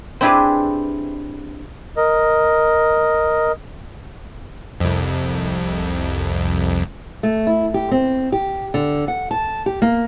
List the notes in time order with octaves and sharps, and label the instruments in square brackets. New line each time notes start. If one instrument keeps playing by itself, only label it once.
[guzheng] C4 D4 E4 G4 G#4 B4
[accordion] A#4 D#5
[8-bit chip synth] C2 F2
[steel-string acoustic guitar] A3
E4
G4
C4
G4
D3
F#5
A5
G4
A#3